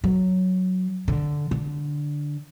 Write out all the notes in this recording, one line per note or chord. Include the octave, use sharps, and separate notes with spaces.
F#3
D3
D3